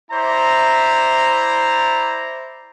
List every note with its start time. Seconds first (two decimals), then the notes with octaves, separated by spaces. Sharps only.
0.11 E4 C5 D5 A#5